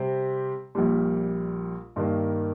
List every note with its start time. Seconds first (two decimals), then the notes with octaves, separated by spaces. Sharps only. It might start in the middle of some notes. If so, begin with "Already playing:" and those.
Already playing: C3 G3 C4 G4
0.75 A#1 A#2 G3
1.96 G2 D#3 A#3